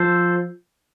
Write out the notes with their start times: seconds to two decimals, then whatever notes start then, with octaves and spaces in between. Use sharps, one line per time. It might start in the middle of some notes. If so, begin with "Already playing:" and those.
Already playing: F3 A4 C5